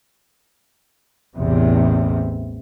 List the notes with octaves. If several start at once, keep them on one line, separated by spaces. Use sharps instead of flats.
A1 E2 C3